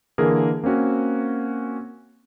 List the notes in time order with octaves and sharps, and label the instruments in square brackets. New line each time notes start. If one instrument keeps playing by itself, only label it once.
[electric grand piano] D3 E3 A#3 G#4 A#4
A#3 C4 C#4 F#4